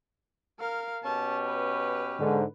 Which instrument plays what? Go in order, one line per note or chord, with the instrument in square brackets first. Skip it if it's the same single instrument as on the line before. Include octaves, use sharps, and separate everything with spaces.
[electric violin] A#4 F5
[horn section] B2 C#4 G4 [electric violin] A5
[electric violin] B4
[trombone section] G#2 D3